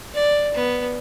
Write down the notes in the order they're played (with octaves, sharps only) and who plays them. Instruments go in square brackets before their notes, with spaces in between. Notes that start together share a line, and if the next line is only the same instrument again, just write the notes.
[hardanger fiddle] D5
B3